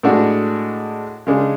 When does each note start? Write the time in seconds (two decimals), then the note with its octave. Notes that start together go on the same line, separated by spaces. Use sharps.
0.03 A2 G#3 D4 F#4
1.27 C#3 G#3 D4